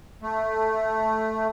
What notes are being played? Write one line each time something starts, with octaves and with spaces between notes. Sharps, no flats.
A3